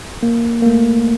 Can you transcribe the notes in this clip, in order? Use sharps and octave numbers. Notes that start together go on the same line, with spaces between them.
A#3
A#3
A3